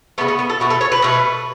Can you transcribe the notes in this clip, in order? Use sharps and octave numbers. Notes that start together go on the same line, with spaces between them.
C#3 F#3 A3 B3
B3
B3
A4
B2 A3 F#4
A4
C#5
B4
B2 A3